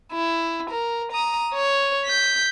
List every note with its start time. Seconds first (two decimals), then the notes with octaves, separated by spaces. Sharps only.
0.12 E4
0.70 A#4
1.12 A#5 D#6
1.54 C#5
2.05 G6 B6